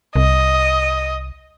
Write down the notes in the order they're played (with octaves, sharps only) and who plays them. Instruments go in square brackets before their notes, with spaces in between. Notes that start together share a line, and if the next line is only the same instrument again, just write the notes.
[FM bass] C2 [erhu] D#5